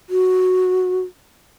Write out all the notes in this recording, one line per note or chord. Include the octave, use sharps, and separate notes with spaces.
F#4